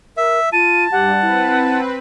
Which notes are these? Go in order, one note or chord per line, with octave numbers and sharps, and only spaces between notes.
A#4 E5
F4 A5 D#7
G2 G3 G4 F#5
C4 E4 B4